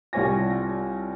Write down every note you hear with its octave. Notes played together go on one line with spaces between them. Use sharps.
C2 G3 F4 C#5 G#5 A#6